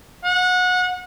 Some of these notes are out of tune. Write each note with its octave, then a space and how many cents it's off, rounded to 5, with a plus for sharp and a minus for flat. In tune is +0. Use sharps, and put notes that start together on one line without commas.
F#5 -25